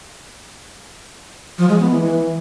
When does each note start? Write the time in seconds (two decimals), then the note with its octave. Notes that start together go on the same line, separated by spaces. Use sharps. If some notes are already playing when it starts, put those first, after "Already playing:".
1.58 F3
1.69 G#3
1.80 B3
1.91 E3
2.01 E3